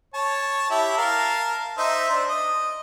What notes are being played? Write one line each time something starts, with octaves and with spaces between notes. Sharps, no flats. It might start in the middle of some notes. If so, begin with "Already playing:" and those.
C#5 A5
E4 G4
A#4 F5 A5
D#4 C5 E5
D4 C5
D#5